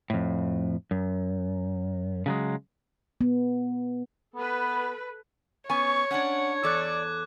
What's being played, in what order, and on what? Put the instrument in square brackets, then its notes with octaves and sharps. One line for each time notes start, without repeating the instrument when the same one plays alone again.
[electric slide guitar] F2 A2
F#2
C#3 F#3 G#3
[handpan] B3
[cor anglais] B3 [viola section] A4 B4
[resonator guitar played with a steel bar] B3 C#4 G#5 [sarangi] C#5 [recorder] C#6
[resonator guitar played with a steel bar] C#4 D4 [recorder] F#5 [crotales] G#6
[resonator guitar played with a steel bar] E2 A4 [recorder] D5 [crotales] D6 F#6